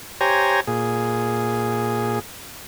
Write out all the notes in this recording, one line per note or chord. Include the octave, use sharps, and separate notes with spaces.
G4 C5 C#5 G#5 A#5
A#2 G#4